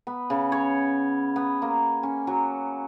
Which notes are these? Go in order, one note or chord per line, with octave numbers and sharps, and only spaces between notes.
B3
C#3
C#5
B3
A#3
C#4
F#3